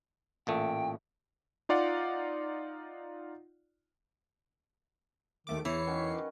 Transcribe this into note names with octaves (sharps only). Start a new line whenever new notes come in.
A1 A#2 A3 G5
D#4 F4 D5 F5 F#5
D#2 D#3 A3 D6
E2 E3 C#5 C7 C#7
D#3 F#3 C#4